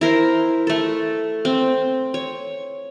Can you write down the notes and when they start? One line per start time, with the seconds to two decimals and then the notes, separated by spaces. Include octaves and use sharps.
0.01 E4 A#4 C5
0.67 A3 A4
1.45 C4
2.14 C#5